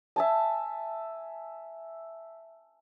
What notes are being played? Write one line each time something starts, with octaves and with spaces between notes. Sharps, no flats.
E5 G#5 A5